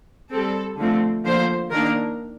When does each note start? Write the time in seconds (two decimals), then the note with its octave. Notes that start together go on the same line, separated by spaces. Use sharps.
0.31 G3 C4 A4
0.78 D3 F3 A3 C4
1.25 D3 F3 A#3 C5
1.71 D#3 A#3 D4 A#4